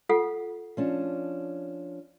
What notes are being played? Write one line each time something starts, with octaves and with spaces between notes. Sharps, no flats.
F4 A4 F#5
F3 C#4 D4